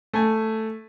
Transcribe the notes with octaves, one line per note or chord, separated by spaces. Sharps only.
A3 G#5